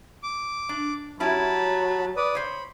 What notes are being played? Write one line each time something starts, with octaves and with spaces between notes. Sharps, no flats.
D6
D4
F#3 C#4 E4 G4 A5 B5
B4 D5 D#6
C5 C#5 B5